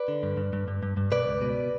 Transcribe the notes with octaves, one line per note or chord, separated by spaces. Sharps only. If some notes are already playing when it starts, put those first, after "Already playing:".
Already playing: B4 D5
D3
G2
G2
G2
G2
G2
G2
B2 B4 D5
C#2
B2